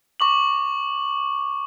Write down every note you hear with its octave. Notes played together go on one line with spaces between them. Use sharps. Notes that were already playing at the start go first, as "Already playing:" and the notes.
C#6 D6 F#7